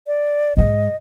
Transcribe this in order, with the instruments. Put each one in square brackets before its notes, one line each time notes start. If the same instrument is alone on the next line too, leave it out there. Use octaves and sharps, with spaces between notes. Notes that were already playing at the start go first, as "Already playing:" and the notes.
[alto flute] D5
[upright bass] G#2 G#3 [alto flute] D#5